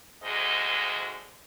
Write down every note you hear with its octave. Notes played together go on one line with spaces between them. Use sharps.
D2 G#2 G#4 D#5